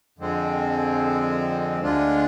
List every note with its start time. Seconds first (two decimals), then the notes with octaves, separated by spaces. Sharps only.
0.18 F2 D3 F3 G#3 C4
1.80 D2 D3 G#3 D4 F4